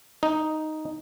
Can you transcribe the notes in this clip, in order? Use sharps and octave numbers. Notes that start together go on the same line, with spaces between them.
D#4